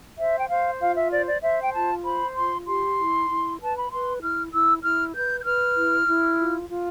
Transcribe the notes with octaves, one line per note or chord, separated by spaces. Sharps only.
C5 E5
G5
C5 F5
F4 F5
E5
C5 D5
D5
C5 E5
G5
F4 A5
C5 B5
F4 C6
G4 C6
E4
E4
B4 A5
B5
B4 C6
E4 F6
E4 E6
E4 F6
B4 G6
G6
B4 F6
E4
E4
F4
F4